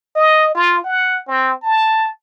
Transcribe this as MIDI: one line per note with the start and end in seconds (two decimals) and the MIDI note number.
0.16 0.52 75
0.55 0.83 65
0.84 1.22 78
1.27 1.53 60
1.62 2.08 81